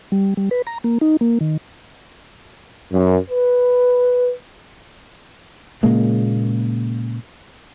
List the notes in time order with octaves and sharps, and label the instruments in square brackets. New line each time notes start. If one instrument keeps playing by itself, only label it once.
[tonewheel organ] G3
G3
B4
A#5
A#3
D#4
A#3
D#3
[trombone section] F#2
B4
[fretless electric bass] A#2 C#3 G#3 A#3